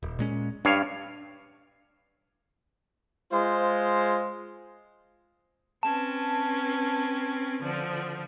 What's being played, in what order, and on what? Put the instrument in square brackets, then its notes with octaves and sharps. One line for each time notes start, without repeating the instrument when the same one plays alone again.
[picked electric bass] D#1
A#2 G#3 C#4
[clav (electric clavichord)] G2 C#5 F5 [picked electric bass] D4
[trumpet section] G#3 F4 C5
[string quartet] C4 C#4 B4 [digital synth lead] A5
[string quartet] D3 F3